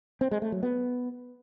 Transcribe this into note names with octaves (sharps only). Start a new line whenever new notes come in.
C4
G#3
A3
F#3
B3